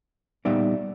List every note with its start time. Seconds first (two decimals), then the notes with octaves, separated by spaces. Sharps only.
0.45 A#2 G3 B3 D#4 D5 E5